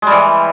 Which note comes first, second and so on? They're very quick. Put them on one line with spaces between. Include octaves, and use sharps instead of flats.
G#3 G3 E3